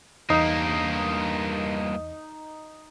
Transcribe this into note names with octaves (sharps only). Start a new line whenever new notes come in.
E2 G2 A#3 D#4